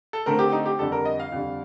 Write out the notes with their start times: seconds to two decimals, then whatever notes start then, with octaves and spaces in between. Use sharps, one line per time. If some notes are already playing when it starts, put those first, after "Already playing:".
0.13 A4
0.26 D3 A3 C4 A#4
0.39 G4
0.52 D#4
0.66 G4
0.79 F2 D3 G3 A4
0.92 A#4
1.05 D#5
1.20 F5
1.32 F2 D3 G3